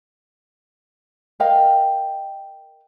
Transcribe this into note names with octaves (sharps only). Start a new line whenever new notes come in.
A#4 D#5 F5 G5